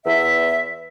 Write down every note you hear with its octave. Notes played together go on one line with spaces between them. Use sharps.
E2 E5